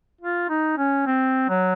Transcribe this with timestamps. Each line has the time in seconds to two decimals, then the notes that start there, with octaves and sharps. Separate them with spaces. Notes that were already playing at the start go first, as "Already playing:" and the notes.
0.21 F4
0.49 D#4
0.78 C#4
1.07 C4
1.49 F#3